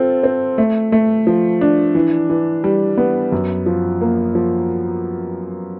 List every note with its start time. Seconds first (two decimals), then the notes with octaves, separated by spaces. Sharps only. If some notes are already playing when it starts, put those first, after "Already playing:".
Already playing: C4 F4 A4
0.23 C4
0.58 A3
0.92 A3
1.27 F3
1.61 D4
1.95 E3
2.30 E3
2.64 G3
2.97 B3
3.32 F#2
3.66 F3
4.01 A#3
4.35 F3